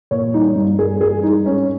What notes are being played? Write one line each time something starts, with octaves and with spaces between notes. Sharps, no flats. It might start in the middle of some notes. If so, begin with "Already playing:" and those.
A#2 C#5
G3 D#4
G2
G2 G#4
G3 G#4
G3 D#4
G#2 C#4